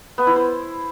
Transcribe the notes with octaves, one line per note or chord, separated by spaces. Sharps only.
B3
E4
C5